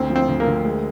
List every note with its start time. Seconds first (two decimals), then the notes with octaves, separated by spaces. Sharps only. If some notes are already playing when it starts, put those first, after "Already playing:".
Already playing: D2 C4
0.10 F3
0.16 C4
0.28 D2
0.40 A#3
0.47 D2
0.64 G#3